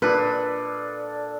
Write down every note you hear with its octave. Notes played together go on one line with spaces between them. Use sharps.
A#2 D4 A4 B4